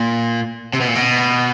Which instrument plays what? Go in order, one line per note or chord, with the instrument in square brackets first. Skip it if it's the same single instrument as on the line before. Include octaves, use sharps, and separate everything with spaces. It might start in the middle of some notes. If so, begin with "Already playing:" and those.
Already playing: [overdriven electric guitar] A#2
C3
B2
A#2
B2